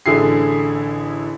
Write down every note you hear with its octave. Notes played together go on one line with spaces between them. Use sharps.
A1 D3 E4 G#4 C7